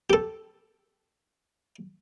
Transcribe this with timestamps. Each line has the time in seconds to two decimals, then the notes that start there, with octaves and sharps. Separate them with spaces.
0.10 G4 A4